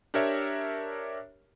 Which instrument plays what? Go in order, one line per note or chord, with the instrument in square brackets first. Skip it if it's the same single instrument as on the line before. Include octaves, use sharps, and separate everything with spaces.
[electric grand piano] D4 G4 A#4 C#5 E5